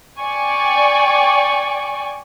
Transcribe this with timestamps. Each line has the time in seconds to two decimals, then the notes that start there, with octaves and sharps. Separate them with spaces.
0.20 D5 G5 G#5 C#6